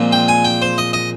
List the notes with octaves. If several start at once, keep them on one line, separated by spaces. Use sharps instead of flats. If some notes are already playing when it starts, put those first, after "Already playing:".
Already playing: A#2 F3 G#3 C4
G5
G#5
G5
C5
D#5
D#5